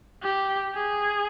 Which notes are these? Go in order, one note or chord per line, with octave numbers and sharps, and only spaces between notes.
G4
G#4